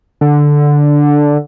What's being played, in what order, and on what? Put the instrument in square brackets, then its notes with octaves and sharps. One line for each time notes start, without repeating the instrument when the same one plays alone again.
[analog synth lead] D3